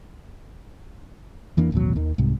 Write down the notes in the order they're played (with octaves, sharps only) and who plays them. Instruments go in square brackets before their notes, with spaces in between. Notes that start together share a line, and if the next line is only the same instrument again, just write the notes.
[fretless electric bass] E2 E3 A#3 D4
A1 D#2 B2 F#3
D#2 D#3
C2 G#2 C3